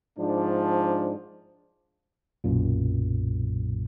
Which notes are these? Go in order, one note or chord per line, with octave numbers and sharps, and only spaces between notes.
G#2 F3 D4
B1 F#2 A#2